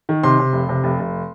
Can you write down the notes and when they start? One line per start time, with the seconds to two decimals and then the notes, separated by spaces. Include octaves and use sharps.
0.09 D#3
0.23 C3 C6
0.39 C3
0.53 F1
0.69 C3
0.84 F1
0.99 F1